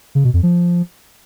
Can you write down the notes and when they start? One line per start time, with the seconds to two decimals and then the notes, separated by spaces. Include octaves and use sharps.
0.15 C#3
0.24 B2
0.34 F2
0.43 F3